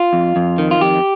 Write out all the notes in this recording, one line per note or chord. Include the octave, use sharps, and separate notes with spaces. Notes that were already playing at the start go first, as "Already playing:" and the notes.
Already playing: F4
F2
F2
D#3
F4
F2 G4